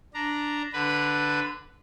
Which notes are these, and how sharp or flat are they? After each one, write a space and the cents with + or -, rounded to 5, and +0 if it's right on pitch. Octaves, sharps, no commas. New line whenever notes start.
D4 +0 A#5 +0
D3 +0 B4 +0